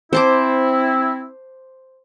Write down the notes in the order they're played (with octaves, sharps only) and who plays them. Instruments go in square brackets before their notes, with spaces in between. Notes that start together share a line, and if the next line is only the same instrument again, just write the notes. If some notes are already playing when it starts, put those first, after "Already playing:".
[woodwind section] C4 E4 [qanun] C5 A5 D6